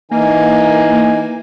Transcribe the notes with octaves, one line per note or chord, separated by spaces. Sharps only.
E3 A#3 D#4 G#5